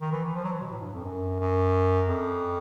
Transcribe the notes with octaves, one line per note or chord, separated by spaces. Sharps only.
D#3
E3
E3
F3
F#3
E3
B2
A2
G2
F2
F#2
F#2
F2